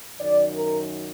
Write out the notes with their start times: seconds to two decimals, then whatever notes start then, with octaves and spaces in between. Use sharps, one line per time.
0.19 F#2 D#3 F#3 D5
0.55 A#4